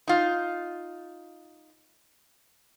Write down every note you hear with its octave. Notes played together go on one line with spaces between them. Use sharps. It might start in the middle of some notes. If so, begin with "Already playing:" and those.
D#4 F4